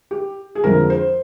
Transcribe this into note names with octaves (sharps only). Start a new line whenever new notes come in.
G4
G#4
F2 D3 F3 G#3 A#4
C5